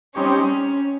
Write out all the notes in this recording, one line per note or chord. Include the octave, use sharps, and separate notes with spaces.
G3 C4 C#4 D#4 G4 C#5